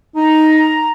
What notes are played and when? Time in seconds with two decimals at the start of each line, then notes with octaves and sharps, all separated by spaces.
0.16 D#4 A#5